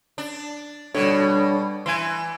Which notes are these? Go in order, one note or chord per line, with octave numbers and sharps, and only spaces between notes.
D4
B2 G3 D4 A4 C#5
E3 G#5 C6